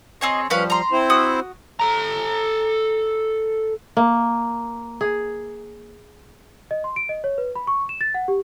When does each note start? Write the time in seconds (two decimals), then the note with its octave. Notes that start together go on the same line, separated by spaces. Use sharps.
0.21 C4 G#4 C#5 D#5
0.50 F3 G3 C#4 B4 F5
0.70 A#5 C6
0.92 C4 E4 C5
1.10 F#4 D#6
1.80 A4 A#5
3.97 A#3
5.01 G#4
6.71 D#5
6.84 C6
6.96 D7
7.09 D#5
7.24 C#5
7.38 B4
7.56 B5
7.67 C#6
7.89 E7
8.01 A6
8.14 F#5
8.28 G4